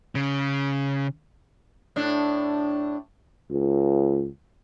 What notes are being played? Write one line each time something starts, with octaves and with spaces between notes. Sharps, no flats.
C#3
A2 D4
C#2